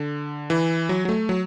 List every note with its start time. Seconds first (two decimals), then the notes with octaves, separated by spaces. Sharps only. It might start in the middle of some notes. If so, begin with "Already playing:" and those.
Already playing: D3
0.50 E3
0.89 F#3
1.05 F#3
1.09 A3
1.29 F#3